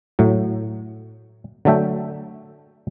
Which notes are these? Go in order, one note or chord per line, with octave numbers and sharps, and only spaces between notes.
A2 F#3
D3 F#3 A3 E5 G5